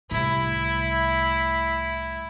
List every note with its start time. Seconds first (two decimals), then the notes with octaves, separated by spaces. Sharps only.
0.11 C2 A2 E4